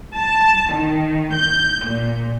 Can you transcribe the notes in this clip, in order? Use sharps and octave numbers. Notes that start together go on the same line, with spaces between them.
A5
D#3
G6
A#2